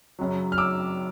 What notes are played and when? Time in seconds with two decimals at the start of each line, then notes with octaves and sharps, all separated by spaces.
0.19 F#2 C#3 F#3
0.52 F6
0.58 D6 E6